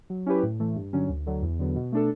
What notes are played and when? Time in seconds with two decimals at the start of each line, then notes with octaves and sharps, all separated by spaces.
0.10 F#3
0.26 C#4 E4 G4 B4
0.43 A2
0.59 E3 A3
0.76 G2
0.93 D3 F#3 C#4
1.09 D2
1.26 D3 F#3
1.42 E2
1.59 D3 F#3 B3
1.75 B2
1.92 A3 D4 A4